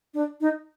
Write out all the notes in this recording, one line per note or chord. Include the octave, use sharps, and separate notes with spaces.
D4
D#4